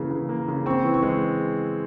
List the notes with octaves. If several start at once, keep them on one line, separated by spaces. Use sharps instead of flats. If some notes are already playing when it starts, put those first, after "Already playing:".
Already playing: C#3 E3 A#3
C#3
A#3
C#3
C4 C#6
E3
C#6
G#3